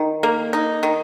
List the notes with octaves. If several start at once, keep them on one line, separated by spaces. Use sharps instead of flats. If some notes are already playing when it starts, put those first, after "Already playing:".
Already playing: D#3
A#3
D#4
D#3